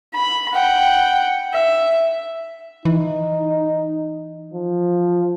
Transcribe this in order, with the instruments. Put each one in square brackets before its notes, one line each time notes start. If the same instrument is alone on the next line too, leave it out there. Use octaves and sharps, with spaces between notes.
[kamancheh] B5
F#5 G5
E5
[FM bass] E3 [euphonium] D#4
[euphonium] F3